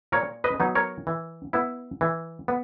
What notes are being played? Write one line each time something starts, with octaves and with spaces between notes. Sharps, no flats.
A#2 A#4 C#5
B4 D#5
F#3 B3 D#4
A#4 C#5
E3
B3 E4
E3
B3